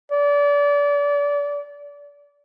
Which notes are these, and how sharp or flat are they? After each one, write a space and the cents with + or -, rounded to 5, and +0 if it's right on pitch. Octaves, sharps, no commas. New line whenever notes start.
D5 -30